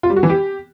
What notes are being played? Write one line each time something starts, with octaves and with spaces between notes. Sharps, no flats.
F4
G3
F#4
E3
G4